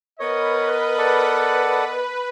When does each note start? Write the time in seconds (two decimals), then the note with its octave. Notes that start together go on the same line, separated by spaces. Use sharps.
0.20 B3 A#4 B4 C#5 D#5
0.98 A4 D5 F#5